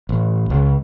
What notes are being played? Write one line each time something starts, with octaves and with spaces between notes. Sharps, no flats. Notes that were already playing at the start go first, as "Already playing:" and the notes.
A1
C#2